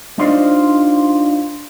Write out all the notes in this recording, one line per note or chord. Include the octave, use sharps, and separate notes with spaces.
D4 D#4 F4 C5 D5 D#5